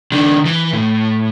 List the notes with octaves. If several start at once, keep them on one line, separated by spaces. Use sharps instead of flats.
D#3 D4
E3
A2